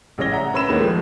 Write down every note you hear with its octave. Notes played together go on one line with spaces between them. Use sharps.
A1 C#3 G3 C#5 A#6 G7
D5 E5 F#5 A#5
C#4 B4 B5 E6 E7
D#2 D#3 G#3 A#3 B3
F3 G#3 A3